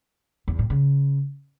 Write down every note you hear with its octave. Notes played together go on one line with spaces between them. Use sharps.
E2
A2
C#3